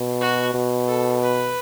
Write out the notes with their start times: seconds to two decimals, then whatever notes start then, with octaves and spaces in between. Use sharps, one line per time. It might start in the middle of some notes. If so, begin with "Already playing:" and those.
Already playing: B2
0.21 F#4
0.54 B2
0.87 A4
1.21 B4